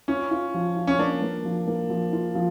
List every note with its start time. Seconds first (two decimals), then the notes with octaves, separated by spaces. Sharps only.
0.08 C#4 F4
0.31 F4
0.54 F3
0.77 F4
0.87 C#4
0.99 A#3 D4
1.22 A#3
1.45 F3
1.68 A#3
1.90 F3
2.13 F4
2.35 F3